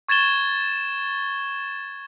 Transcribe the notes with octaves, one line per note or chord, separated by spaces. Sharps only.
C#6 G#6 A6 E7 G7